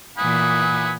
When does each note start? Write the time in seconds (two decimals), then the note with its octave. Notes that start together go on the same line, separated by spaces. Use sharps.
0.18 A#2 E3 F#5 G#5 B5 D#6